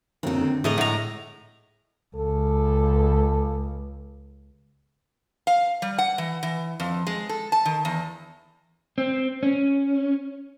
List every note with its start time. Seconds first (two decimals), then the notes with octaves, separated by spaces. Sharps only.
0.23 F#1 D3 D#3 F#3 C4
0.41 D3
0.64 A2 G#4 D5 D#5 A#5
0.78 A2 G#3 F#5 A#5
2.16 C#2 A4
5.47 F5
5.82 G3
5.98 F#5
6.18 E3
6.43 E3
6.80 F2
7.07 G#3
7.29 A4
7.52 A5
7.65 D#3
7.85 E2
8.98 C4
9.43 C#4